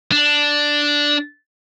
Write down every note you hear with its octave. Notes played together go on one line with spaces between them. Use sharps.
D4